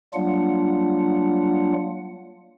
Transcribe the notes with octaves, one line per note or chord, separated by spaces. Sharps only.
F#3 G3 A#3 D4 F4 F#5